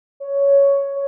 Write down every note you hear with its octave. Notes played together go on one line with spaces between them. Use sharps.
C#5